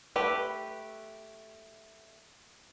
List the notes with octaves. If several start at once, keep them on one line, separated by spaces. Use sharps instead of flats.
A3 G4 B4